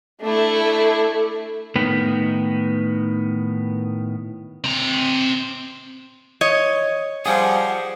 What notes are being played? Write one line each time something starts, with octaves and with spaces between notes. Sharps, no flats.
A3 D4 E4
A2 D#3 B3
C4 A#5
C#5 D#5
F3 G3 G#4 F#5